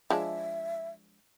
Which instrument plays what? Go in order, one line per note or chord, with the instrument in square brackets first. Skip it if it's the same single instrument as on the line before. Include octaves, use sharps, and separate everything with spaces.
[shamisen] F3 G#3 D4 [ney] E5